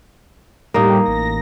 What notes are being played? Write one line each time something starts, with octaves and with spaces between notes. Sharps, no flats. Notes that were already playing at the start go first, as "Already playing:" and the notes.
A2 G3 A#3 D#4 G4
A1 A#6